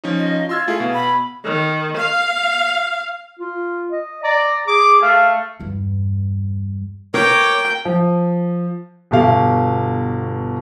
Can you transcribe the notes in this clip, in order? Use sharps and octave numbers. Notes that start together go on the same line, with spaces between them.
F3 C#4 D#4
D#5
F4 C6 E6 G#6
A3 E4 G#4 F5
B2
B5
D#3
F5
F4
D#5
D5 A#5
G#4 D6
A3 F5
E2 G2
A#4 C#5 G5 D6
F3
G1 B2 G4 F5